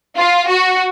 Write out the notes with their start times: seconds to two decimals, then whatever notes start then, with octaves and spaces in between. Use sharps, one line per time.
0.18 F4
0.49 F#4